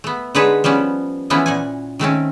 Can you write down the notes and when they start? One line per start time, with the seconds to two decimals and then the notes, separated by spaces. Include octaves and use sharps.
0.04 A3 B3
0.35 D3 G#3 D#4 B4 C#5 A5
0.64 F3 G3 B3 C#4
1.30 E3 F3 A3 B3 C#4 E4
1.46 A#2 F#5 G#5
1.99 D#3 A3 C4 C#4